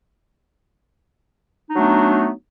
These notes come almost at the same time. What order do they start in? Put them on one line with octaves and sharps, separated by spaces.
D#4 D4 F#3 A3 B3